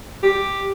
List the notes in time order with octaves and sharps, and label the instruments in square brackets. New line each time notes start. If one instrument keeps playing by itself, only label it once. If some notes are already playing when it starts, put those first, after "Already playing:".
[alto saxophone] G4